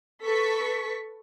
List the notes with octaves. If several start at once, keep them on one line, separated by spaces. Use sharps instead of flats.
A4 B4 C#6 B6